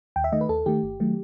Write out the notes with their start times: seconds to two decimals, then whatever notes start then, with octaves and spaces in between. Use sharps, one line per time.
0.16 D#2 G5
0.24 E5
0.32 D#3 A3 D#5
0.41 B4
0.49 D#2 A4
0.66 D#3 A3 G4
0.83 G1
1.00 D#3 F#3 A3